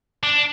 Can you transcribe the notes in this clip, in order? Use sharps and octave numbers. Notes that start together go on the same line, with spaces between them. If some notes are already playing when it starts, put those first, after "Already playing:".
D4